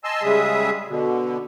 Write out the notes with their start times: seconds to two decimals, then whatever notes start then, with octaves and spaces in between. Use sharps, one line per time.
0.04 D#5 G#5 A5 C6 E6
0.23 C#3 G3 G#3 G#4 E5 D#6
0.89 B2 D3